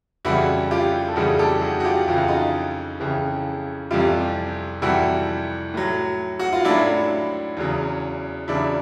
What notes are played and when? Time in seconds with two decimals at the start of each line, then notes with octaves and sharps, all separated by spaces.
0.25 F2 C#3 E3 G3 E4 F#4
0.71 F4 G4
1.08 A4
1.16 F2 C#3 E3 G3 F#4 G#4
1.39 G4 A4
1.61 F#4 G#4
1.80 F#4
1.85 F4 G4
2.07 F2 C#3 E3 F4
2.17 F#4
2.28 D#4 F4
3.00 F2 C#3 E3
3.91 F2 C3 E3 G3 F4 G4
4.82 F2 C3 E3 G3 E4 F#4
5.74 A2 F#3
6.39 F#4
6.53 F4
6.65 A2 F#3 D4 E4
7.57 E2 C#3 F#3
8.48 E2 C#3 F#3 D4 E4